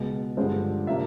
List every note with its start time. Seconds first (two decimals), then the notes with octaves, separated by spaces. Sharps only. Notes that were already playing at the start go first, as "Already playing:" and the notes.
Already playing: C#2 B2 G#3
0.37 G2 D3 F3 G#3 C4
0.87 C3 F3 A#3 D4 E5